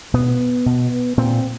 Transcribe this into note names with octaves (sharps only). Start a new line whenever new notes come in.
B2 B3
B2
A#2 C4